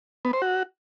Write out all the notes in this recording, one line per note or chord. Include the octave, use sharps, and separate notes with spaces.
B3
C5
F#4